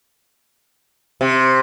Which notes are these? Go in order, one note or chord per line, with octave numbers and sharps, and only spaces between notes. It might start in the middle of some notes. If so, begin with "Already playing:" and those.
C3